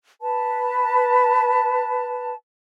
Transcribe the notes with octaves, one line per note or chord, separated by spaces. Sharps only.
B4 A5